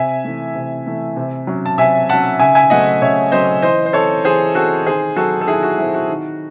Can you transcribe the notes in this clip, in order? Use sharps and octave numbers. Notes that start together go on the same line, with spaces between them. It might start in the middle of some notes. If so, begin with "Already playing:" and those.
Already playing: C3 E5 G#5
E3 A3
C3
E3 A3
C3
F#3 C#4
A5
C3 E5 G#5
F#3 C#4 F#5 A5
C#3 E5 G#5
E5 G#5
F#3 A3 C4 D#5 F#5
C#3 C#5 E5
F#3 A3 C4 C5 D#5
E3 C5 D#5
C5
C4 A4 C#5
E3 G#4 C5
C4 F#4 A4
D#3 G#4 C5
F#3 C4 F#4 A4
A4
D#3 E4 G#4
F#4
F#3 C4 E4
F#4
D#3